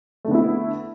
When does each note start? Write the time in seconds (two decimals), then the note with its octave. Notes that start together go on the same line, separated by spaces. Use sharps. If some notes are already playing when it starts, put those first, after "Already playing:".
0.25 A3
0.28 D3
0.31 B3
0.35 E4